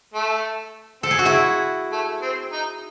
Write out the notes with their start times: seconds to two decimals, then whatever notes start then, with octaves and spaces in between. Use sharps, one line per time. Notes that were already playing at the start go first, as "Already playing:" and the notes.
0.14 A3
1.03 C4 A4
1.11 G#4
1.19 F#4
1.25 E4 G#4
1.92 A3
2.22 C4
2.53 D#4